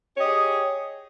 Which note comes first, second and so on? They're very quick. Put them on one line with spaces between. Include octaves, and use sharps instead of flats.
C#5 G4 D#5 G#4